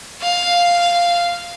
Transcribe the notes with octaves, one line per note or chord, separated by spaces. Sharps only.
F5